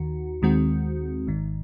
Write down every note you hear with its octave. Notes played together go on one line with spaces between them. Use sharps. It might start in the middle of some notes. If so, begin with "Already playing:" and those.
Already playing: D#2 D#3 F#4
D#2 D#3 G#3 C4 F#4
G#1 G#2 D#3